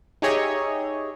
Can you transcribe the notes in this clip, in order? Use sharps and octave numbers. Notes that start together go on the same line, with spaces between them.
D#4 G4 G#4 C#5 D#5 E5